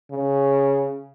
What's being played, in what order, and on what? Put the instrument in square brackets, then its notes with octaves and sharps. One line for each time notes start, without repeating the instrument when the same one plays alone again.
[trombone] C#3